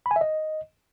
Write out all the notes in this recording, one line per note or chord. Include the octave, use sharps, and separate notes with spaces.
B5
G#5
E5
D#5